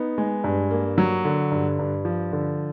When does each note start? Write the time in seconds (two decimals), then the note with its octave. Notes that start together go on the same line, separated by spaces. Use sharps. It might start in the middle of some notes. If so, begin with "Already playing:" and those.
Already playing: B3 D#4
0.18 G#3
0.44 G2
0.71 A#3
0.98 F#3
1.25 D3
1.52 G2
1.79 G2
2.05 F3
2.32 D3